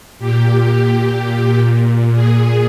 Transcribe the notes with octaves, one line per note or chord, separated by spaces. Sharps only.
A#2 G4
A#2
G#4